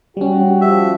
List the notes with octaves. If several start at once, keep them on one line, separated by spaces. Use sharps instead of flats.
G3 C#4 F#4 G4
F3 E5